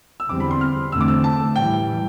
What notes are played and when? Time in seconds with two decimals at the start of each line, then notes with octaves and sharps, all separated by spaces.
0.20 E6
0.29 E2 D3 G3 C4 D6
0.40 B5
0.51 C6
0.61 F6
0.92 E2 D3 A3 C4 E6
1.01 D6
1.08 E6
1.24 A5
1.55 A2 E3 G3 G5